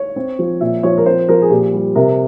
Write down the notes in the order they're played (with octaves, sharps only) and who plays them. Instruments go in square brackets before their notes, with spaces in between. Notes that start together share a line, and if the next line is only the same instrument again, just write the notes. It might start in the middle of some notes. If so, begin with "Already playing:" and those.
Already playing: [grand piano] C#5
C4
F3
A#2 E5
F3 C#5
A#4
C4 C5
F3 A#4
G#4
A#2 G4
G3
C3 A#4